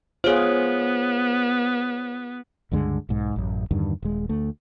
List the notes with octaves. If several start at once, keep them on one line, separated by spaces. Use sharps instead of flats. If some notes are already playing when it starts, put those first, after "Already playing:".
B3 F4 G#4 C5 C#5
C#2 G2 D3 G#3
B1 G#2
A1 F#2
E2 G2 D3 D#3
D#1 G#3
D2 A3